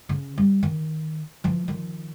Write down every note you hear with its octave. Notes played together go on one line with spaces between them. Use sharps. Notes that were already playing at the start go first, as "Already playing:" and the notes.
C#3 C#4
G3
D#3
E3 F3
D#3 F3